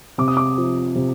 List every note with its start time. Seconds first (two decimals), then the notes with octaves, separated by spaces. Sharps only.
0.18 C3 D6
0.28 D#6
0.37 D6
0.58 F3
0.95 C3